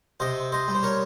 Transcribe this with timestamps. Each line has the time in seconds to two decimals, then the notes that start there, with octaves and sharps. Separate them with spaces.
0.20 C3 C5 D#5
0.52 C5 D#5
0.68 G3
0.75 C5
0.83 A#4 C#5